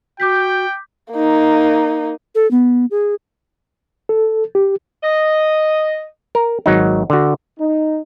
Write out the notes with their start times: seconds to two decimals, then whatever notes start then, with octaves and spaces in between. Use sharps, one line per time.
0.20 F#4 G5 D6 G6 B6
1.13 A#3 D#4
2.35 A4
2.51 B3
2.91 G#4
4.09 A4
4.55 G4
5.03 D#5
6.35 A#4
6.66 G#1 F#3 D#4
7.10 D3 F#4
7.58 D#4